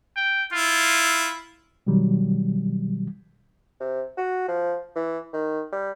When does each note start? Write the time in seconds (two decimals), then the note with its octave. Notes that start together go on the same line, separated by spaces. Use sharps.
0.16 G5
0.53 E4 F4
1.87 B2 D#3 F#3 G3
3.80 C3
4.17 F#4
4.48 F3
4.96 E3
5.33 D#3
5.72 G3